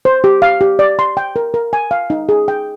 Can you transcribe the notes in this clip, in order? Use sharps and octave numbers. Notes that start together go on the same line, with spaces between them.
C5
G4
F5
G4
D5
C6
G5
A#4
A#4
G#5
F5
D#4
G#4
G5